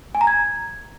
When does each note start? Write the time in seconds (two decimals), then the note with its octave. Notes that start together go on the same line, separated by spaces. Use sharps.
0.15 G#5
0.21 A#5
0.27 G#6